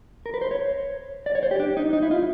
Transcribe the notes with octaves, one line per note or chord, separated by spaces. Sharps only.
A#4
B4
C5
C#5
D5
C#5
C5
G4
D4
D#4
D#4
E4
F4